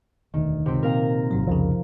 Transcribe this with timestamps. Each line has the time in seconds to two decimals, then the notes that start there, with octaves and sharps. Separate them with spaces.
0.34 E1 D2 D#3
0.66 F#1 C#2 C3 C4
0.83 A#2 A#3 C4 A#4 F5 A#5
1.31 G#1 G#2 F#3
1.47 C2 F2 C#3 F3